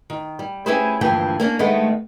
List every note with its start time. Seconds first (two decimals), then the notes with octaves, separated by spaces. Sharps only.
0.10 D#3
0.39 G3
0.66 C#4 E4 G4 G#4 B4 C5
1.01 D2 G2 E3 F3 A#3 G5
1.40 A#3 C#4 D4
1.59 D#3 G#3 A3 B3